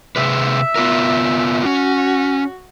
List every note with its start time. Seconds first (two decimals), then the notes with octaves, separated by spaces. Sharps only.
0.16 C3 G#4 B4 E5
0.76 B3 F4 A#4
1.66 C#4 F#4